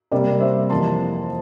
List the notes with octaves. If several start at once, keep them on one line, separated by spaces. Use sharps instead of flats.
C3 G3 A#3 A#4 D5
C5 E5
F2 E3 A#3 A5 C6